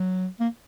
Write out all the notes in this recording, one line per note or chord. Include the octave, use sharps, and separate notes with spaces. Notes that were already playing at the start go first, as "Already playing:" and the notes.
Already playing: F#3
A#3